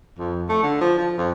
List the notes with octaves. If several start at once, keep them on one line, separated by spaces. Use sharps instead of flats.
F2
A3
D3
F3
F3
F2